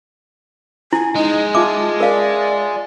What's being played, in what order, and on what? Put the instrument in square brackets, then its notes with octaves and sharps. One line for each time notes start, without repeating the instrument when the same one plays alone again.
[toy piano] E4 [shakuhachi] G#5
[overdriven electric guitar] G#3 [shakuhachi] D#4
[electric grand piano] F4 E5 [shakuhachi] A5 [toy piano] D6
[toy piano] A#4 F5 [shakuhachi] D5